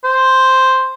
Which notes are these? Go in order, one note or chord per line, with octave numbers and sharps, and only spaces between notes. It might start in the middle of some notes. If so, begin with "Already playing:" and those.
C5